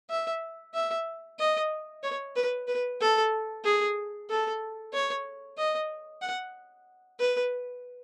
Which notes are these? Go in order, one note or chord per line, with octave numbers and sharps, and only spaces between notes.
E5
E5
D#5
C#5
B4
B4
A4
G#4
A4
C#5
D#5
F#5
B4